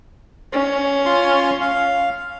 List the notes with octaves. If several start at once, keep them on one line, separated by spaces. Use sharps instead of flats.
C#4
F4 C6
F5